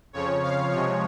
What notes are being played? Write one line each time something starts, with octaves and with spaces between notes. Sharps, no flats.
F2 C#3 F3 C#5
F5
C3 F3 G#3 C#5